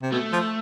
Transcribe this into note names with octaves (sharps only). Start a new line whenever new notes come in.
C3
B2 A3
F3